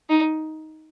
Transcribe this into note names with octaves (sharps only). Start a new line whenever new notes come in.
D#4